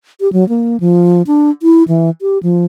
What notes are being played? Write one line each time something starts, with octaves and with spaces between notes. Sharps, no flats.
G4
F#3
A#3
F3
D4
E4
E3
G4
F3